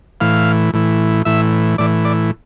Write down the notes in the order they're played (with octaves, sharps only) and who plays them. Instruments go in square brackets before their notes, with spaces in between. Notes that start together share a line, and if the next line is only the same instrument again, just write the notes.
[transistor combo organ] A2 E3 F5
A2 E3
A2 E3 E5
A2 E3 D5
D5